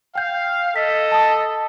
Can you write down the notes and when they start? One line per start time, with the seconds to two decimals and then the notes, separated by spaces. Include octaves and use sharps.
0.15 F5 G5 G6
0.76 A4 D#5 B6
1.12 A5 D#6